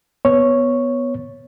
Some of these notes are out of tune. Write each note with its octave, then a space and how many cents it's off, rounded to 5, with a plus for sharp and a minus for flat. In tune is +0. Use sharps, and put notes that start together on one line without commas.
B3 +0 C#5 +0